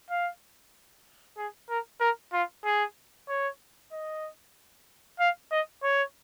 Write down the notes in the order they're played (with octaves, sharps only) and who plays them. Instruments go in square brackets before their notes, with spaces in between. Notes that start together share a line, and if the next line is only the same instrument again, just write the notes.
[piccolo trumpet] F5
G#4
A#4
A#4
F4
G#4
C#5
D#5
F5
D#5
C#5